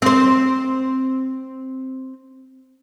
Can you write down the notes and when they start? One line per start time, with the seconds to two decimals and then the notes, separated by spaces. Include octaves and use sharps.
0.02 C4 C5